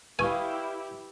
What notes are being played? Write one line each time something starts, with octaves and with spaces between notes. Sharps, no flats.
E4 G4 B4 D5 D#5 F5 G#5 C#6